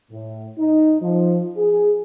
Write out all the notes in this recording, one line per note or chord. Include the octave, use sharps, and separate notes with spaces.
A2
D#4
F3
G#4